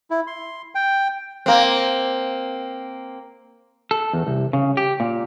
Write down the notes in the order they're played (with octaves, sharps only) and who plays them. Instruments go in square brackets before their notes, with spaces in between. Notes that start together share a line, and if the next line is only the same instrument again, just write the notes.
[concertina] E4
C6
G5
[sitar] A#3 C4
[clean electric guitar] A4
E2
C2
C#3
G4
A#2